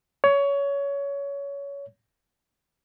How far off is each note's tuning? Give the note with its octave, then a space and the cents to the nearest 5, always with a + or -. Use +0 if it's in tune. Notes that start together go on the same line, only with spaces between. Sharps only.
C#5 +20